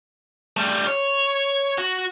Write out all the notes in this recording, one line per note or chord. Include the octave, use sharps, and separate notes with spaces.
G3 A3
C#5
F#4